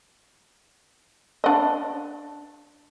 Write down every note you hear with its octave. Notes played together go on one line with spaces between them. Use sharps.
D4 D#5